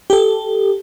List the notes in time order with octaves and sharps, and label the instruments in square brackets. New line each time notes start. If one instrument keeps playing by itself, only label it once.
[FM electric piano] G4 A4